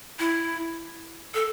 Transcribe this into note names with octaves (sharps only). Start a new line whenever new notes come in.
E4
A4